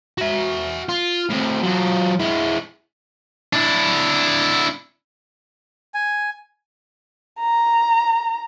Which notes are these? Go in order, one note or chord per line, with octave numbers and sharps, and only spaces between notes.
F#4 E5
F4
A2 C4
F#3 F4
G#3 E4
D4 E4
G#5
A#5